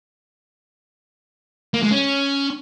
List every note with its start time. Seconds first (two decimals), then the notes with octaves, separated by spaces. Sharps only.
1.74 A#3
1.83 G#3
1.91 C#4